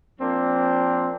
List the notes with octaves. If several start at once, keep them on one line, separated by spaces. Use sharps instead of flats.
F3 A#3 C4 D4